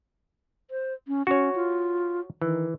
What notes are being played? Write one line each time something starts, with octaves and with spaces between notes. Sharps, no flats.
C5
C#4
C#4 F#4 C#5
F4
D#3 E3